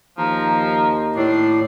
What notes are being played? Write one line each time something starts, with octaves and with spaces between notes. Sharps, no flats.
D#2 F3 A#5
A2 D4 C7